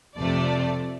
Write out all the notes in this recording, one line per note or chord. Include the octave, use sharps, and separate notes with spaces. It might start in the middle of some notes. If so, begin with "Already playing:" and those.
F2 C3 A3 D5